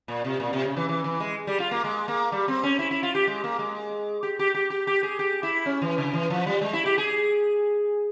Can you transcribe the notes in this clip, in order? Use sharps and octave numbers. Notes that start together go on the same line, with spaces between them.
A#2
C3
A#2
C3
C#3
E3
E3
E3
G#3
G3
F4
A#3
G#3
A#3
G3
C4
C#4
E4
E4
F4
G4
G#3
A#3
G#3
G4
G4
G4
G4
G4
G#4
G4
E4
C#4
E3
C#3
E3
F3
G3
G#3
E4
G4
G#4